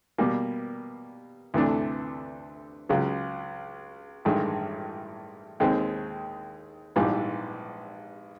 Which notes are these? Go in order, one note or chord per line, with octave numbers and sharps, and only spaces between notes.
B2 G3 A#3
D2 C3 E3 A3 D4
C#2 C#3 F#3
A1 G2 D#3 G#3
D#2 D#3 G#3 C4
A#1 G#2 E3 G3